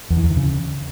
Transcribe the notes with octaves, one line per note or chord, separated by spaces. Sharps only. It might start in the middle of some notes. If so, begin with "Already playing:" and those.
E2
E3
E2
D#3
C#3